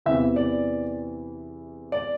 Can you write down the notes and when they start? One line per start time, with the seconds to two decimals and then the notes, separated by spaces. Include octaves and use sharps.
0.06 E2 C3 E3 E5
0.36 D5
1.92 D5